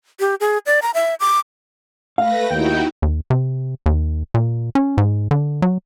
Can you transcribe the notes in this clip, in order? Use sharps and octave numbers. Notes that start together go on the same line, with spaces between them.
G4
G#4
D5
A#5
E5
D6
A3 B4 F5 A#6
D#2 D#4 E4 F#4 G5
D#2
C3
D#2
A#2
C#4
G#2
D3
F#3